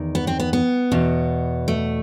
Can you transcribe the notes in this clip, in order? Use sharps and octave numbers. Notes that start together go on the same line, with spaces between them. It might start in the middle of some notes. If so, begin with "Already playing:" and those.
Already playing: E2 D#3
B3
C4
B3
B3
E2 B2
A3